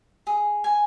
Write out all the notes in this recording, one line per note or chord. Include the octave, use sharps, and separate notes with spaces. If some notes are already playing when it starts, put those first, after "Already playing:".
G#4
G#5